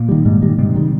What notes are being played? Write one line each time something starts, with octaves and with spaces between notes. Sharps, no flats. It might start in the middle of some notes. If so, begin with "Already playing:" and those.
Already playing: A#2 A#3
D#3 G3
G#2
D#3 G3
G#2 C3 C4
D#3 G3